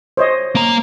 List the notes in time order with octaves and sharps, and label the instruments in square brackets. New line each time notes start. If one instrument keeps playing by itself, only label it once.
[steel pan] C5 C#5 D#5
[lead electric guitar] A#3 A#5